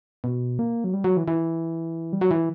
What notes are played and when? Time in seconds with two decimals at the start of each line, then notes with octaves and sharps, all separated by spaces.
0.24 B2
0.59 A#3
0.84 F#3
0.94 G3
1.04 F#3
1.17 E3
1.28 E3
2.13 G3
2.21 F#3
2.31 E3